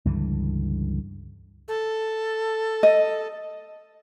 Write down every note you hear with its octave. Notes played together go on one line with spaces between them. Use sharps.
C#2 G2 D3 E3
A4
D#5